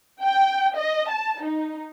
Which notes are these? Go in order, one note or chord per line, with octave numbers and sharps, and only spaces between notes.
G5
D#5
A5
D#4